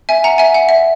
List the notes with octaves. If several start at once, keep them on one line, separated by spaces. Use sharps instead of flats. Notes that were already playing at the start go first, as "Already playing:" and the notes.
E5 G#5
F#5 A#5
E5 G#5
F#5
E5